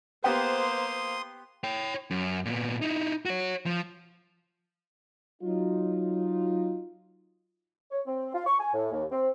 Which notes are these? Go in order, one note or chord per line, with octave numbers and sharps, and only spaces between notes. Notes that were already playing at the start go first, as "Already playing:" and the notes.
A#3 B3 G4 C5 C6 D#6
C#5 G5
F#2
A#2 B3
D#4 E4
F#4 C#5
F3
F#3 D#4 F4
C#5
C4
F4
C#6
G#5
A2
D#2
C4